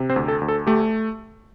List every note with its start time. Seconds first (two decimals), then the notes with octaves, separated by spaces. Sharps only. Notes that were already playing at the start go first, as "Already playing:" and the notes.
Already playing: C3
0.10 C4 C5
0.16 D2
0.28 A4
0.41 D2
0.48 A4
0.67 A3 G4